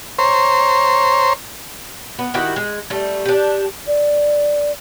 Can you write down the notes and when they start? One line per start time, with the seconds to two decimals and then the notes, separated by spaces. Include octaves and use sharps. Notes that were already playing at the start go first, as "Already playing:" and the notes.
0.19 C5 C#5 A#5 C6
2.19 B3
2.34 D#3 E4 F#4 G4
2.56 G#3
2.90 G3 A3
3.25 D4 G4
3.87 D5